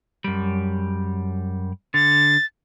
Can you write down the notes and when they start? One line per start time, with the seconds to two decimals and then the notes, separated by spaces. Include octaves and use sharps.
0.24 F#2 G3
1.94 D3 A6